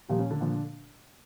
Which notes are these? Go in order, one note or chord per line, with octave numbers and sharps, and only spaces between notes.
A#2 F3 G3 G4
C#4
D3 D4
A#2 F3